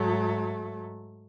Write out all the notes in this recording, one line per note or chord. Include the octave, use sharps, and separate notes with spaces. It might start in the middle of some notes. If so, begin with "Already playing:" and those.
Already playing: G#2 F#3 A3